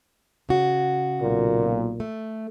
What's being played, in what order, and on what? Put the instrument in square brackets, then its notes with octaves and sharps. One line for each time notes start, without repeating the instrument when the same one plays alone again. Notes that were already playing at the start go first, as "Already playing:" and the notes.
[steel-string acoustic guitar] C#3 F#4
[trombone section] B1 A#2
[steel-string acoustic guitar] A3